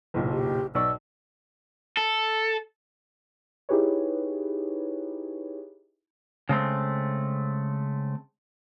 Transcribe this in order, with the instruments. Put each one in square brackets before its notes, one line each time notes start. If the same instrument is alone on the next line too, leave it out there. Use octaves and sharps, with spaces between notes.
[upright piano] F#1 B1 A#2
[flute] G4
[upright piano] B1 D5 C#6 [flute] E6
[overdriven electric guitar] A4
[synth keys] D#4 E4 G4 G#4 B4 C#5
[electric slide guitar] C#3 G#3 A3 C4